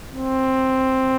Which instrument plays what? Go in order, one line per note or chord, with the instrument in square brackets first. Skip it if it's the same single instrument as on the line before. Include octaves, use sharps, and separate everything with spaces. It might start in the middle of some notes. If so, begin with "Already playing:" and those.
[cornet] C4